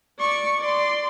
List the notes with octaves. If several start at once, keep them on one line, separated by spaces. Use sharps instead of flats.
D5 C#6
D5 C6